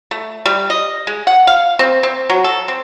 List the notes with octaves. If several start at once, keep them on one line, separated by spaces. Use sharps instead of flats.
A3
G3
D#5
G#3
F#5
F5
C4
C4
F#3
A4
C4